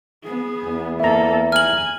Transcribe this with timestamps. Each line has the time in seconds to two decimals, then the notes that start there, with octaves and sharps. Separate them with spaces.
0.23 B3 G#4
0.64 E2
1.00 A#3 A4 E5 A#5
1.52 G#5 F6 F#7